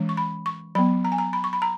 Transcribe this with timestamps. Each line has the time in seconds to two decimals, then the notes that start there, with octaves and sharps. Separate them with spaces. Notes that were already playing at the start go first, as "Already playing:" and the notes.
Already playing: E3 G#3 C#4
0.09 C#6
0.17 B5
0.46 C#6
0.75 F#3 B3 B5
1.04 A#5
1.12 G#5
1.18 A#5
1.33 B5
1.44 C#6
1.53 B5
1.62 A#5